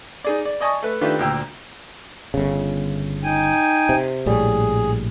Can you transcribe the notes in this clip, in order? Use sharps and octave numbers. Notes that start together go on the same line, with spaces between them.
D#4 G#4 D5
D5
D5 D#5 G#5 A5 C#6 D#6
A3 B4
D#3 A3 D4 F4 G4 B4
D2 A#2 G5 E6
G1 C#3
D#4 G5 G#5
C3
A#1 A2 G3 G#4